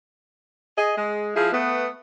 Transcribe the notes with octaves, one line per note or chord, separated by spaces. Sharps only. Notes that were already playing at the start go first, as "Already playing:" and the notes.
G#4 D#5
G#3
F3 E4 G#4
A3 B3